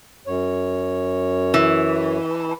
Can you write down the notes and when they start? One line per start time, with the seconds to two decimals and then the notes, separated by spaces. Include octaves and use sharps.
0.27 F#2 C#5
1.54 E3